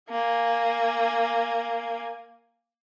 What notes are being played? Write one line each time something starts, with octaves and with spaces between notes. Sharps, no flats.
A#3 G#5